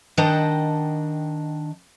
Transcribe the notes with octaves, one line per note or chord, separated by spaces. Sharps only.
D#3 D4 D#5 F#5 G5 A5